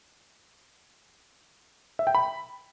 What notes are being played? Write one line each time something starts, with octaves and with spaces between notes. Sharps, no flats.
E5
G5
B5